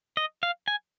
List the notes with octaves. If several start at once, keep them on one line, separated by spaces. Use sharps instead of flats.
D#5
F5
G#5